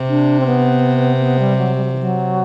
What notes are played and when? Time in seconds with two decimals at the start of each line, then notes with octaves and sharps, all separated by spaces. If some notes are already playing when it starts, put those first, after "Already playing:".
Already playing: C3
0.09 D4
0.40 C4
0.46 B3
1.20 B3
1.39 G3
1.58 F#3
1.76 G3
1.85 F#3
1.92 E3
2.00 F#3